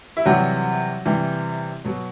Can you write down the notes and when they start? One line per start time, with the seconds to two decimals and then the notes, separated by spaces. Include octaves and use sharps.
0.17 E4
0.26 C3 E3 F#3 G3 F#4
1.05 C3 E3 G3
1.85 B2 F#3